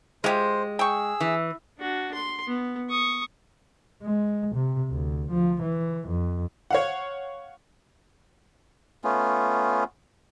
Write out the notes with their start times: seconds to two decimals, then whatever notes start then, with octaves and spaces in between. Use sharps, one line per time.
0.24 G#3 F4 G4 C5
0.79 G#4 G5 C#6 E6
1.21 E3
1.79 D4 F#4
2.14 C6
2.48 B3
2.90 C#6 D#6
4.02 G#3
4.55 C3
4.90 D2
5.30 F3
5.62 E3
6.08 F2
6.71 C#5 F5 F#5
9.04 A3 B3 C#4 F4